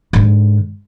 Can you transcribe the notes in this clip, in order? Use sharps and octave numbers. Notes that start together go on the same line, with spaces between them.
G#2 D3